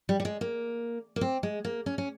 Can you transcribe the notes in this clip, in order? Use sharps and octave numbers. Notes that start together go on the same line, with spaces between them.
G3
G3
G#3
A#3
A#3
C4
G#3
A#3
C#4
C#4